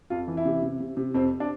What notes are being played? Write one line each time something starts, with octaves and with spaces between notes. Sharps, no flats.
F2 F4
E3
E4
C3
C3
C3
C3
F2 C4
D4